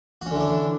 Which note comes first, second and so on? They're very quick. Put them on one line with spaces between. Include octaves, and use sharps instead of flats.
F#4 C#4 D3 E3 D4